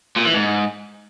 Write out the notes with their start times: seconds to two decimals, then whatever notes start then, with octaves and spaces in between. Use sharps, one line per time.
0.17 A#2
0.25 E3
0.34 G#2